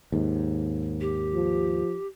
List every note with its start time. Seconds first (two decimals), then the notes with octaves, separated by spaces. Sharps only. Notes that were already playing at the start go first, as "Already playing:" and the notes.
0.12 D#2 G#2
1.01 G4
1.34 F3